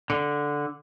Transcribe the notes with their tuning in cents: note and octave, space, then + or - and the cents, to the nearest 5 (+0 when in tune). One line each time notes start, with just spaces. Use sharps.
D3 -5